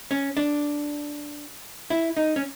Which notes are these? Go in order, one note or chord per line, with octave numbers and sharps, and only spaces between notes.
C#4
D4
E4
D#4
C#4